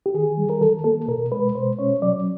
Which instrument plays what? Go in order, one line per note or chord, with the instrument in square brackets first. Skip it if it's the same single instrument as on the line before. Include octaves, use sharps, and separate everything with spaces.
[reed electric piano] G4
D#3 G#4
G3
A#4
D#3 A4
A#3 A4
B2 A#4
G#3 B4
B2 C5
C#4 C#5
F#3 D5